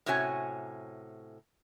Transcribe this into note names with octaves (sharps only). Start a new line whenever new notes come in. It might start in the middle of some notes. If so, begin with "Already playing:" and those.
A2 C3 C#4 F#4 C#5 G#5